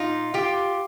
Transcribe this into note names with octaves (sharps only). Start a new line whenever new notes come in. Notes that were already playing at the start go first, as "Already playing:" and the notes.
Already playing: A#2 D#4 F4
F4 G4